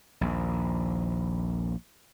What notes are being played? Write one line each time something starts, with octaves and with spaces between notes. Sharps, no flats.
A#1 D#2